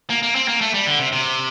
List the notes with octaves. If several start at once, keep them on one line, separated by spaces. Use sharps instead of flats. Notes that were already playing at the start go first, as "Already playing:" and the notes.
A#3
A#3
C4
A#3
A3
G3
D3
C3
C3